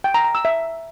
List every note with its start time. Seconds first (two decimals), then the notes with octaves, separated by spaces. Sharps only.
0.04 G5
0.14 A#5
0.25 A#5
0.35 E6
0.45 E5